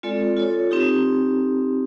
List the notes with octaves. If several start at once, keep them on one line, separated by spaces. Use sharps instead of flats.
G#3 C4 F4 A4 D5
F4 A4 C#5
C4 D#4 G4